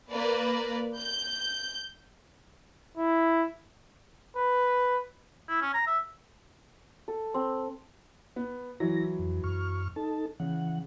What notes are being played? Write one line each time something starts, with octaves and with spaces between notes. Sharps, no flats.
A#3 B4 D5
G6
E4
B4
E4
C#4
A#5
E5
A4
C4
B3
E3 F#3 E4 A#6
F2
F#2 C#6 F6
D#4 A4 A5
C#3 E3 F#5